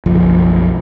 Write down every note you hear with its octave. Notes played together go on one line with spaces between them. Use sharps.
F#1 B1 F3